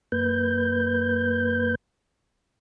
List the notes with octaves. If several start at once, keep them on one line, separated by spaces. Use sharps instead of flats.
F#2 A#3 B4 G6